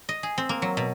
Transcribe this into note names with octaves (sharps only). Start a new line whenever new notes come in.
D#5
G#4
C4
A#3
F#3
B2